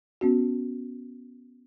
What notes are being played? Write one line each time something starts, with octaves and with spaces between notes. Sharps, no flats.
B3 C#4 F#4